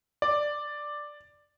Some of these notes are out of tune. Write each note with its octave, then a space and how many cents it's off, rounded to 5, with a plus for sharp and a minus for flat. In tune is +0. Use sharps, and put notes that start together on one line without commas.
D5 +5